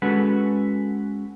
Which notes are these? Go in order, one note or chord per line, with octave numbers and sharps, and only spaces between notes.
G#3 C#4 F#4 A4 B4